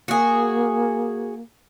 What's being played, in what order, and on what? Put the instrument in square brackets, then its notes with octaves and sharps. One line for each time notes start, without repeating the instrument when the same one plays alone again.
[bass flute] A#3 [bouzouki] F#4 G#4